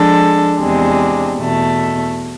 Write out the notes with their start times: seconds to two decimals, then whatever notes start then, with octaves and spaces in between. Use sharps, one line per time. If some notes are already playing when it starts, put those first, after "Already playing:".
Already playing: F3 G#3 D4 A4
0.57 E2 C3 G#3 D4
1.38 E2 B2 A3